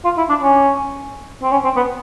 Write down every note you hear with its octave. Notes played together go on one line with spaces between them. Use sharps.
F4
E4
D4
C#4
C4
C#4
C4
B3